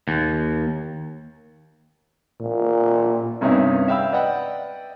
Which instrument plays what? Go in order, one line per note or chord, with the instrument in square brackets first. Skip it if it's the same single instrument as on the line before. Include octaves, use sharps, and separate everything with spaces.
[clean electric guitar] D#2
[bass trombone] A#2
[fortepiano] G2 C3 B3 C#4 D#4 E4
E5 F5 G5 B5 E6
B4 D5 D#5 F#5 G5